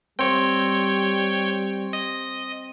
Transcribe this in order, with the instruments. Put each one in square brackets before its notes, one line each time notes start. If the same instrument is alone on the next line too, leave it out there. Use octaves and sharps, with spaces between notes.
[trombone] G3 [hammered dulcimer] C4 [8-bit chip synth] C#5 G5
[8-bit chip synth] D#5